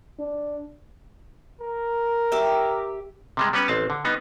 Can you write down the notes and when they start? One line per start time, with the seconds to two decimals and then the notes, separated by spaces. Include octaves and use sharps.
0.19 D4
1.60 A#4
2.32 G4 E5
3.37 C3 G3 G#3
3.53 G3 B3 C#4 B4 C#5
3.68 A1 C4 A5
3.90 D3
4.05 G3 B3 D#4